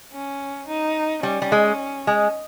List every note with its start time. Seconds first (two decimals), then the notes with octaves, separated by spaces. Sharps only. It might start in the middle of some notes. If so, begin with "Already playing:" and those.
0.13 C#4
0.68 D#4
1.23 G3 C#4
1.42 G3
1.52 G#3
2.07 G#3